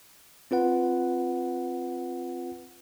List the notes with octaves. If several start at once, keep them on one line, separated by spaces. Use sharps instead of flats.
C4 F4 B4 F#5